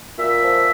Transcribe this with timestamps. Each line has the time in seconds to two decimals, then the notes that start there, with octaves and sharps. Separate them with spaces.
0.18 A#2 E5
0.43 F3